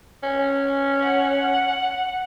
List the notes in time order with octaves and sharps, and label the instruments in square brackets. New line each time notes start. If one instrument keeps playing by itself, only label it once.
[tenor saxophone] C#4
[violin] F#5